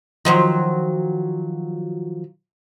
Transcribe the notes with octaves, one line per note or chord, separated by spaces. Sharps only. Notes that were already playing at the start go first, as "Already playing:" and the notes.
D#3 F3 F#3